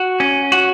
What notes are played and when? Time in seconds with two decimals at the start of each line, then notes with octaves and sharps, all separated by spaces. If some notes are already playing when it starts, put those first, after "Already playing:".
Already playing: F#4
0.20 C#4
0.52 F#4